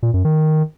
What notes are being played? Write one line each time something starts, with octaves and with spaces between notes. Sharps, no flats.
A#2
F#2
D#3